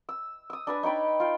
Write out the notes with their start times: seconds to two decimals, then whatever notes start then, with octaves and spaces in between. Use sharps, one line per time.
0.09 E6
0.50 D#6 E6
0.67 D4 B4 G#5
0.83 D#4 C#5 G5 B5
1.20 F4 G5